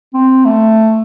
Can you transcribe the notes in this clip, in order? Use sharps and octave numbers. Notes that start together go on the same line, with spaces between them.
C4
A3